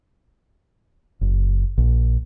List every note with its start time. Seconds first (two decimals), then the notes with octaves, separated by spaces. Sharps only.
1.21 F#1
1.78 A#1